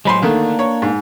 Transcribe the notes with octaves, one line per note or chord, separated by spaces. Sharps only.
A2 F#3 G#3 C5 B5 C6
D3 D#3 A3 A#3 D4
C#5
G#2